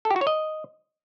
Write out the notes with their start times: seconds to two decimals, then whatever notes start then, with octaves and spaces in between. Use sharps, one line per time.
0.05 A4
0.11 G4
0.16 F#4
0.21 C#5
0.27 D#5